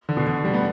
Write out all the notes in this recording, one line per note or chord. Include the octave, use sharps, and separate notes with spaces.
D3
B2
D3
G3
B3